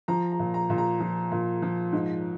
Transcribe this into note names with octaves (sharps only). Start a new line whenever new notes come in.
F3 A#5
A#5
A#2
A#5
A#2
A#5
F3
A#2
F3
G#2